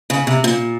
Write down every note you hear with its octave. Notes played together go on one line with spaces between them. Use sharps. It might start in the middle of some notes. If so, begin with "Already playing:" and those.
C#3
C3
A#2